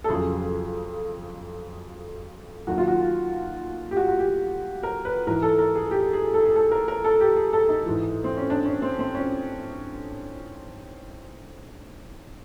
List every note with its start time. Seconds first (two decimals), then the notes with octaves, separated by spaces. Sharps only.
0.04 A4
0.09 F2 C#3 F#3 G#4
2.67 D#2 D#3 F#3 F#4
2.78 F4
2.88 F#4
3.91 G4
3.97 F#4
4.08 F#4
4.19 G4
4.83 A#4
5.05 B4
5.27 G#2 E3 A#4
5.42 A4
5.58 A#4
5.76 G#4
5.91 G4
6.13 G#4
6.34 A4
6.45 G#4
6.56 A4
6.71 A#4
6.88 A#4
7.04 A4
7.20 G4
7.36 G#4
7.53 A4
7.69 D#4
7.85 G#2 E3
8.24 C4
8.37 C#4
8.50 D4
8.66 C#4
8.82 C4
8.99 C4
9.15 C#4